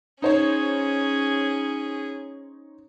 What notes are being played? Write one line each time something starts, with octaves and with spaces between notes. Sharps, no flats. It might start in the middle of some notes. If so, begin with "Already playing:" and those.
C#4 D#4 G#4 C5 C#5